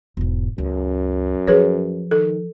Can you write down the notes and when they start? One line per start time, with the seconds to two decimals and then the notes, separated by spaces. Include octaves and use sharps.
0.17 E1 G#2
0.58 C#2 F#2
1.47 F3 G#4 B4 C#5
2.11 D#3 A4